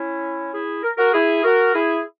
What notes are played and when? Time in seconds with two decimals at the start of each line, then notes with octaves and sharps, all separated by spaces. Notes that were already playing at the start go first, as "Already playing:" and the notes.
Already playing: C#4 E4
0.52 E4 G#4
0.83 A#4
0.97 F#4 A#4
1.13 E4 G#4
1.44 F#4 A#4
1.74 E4 G#4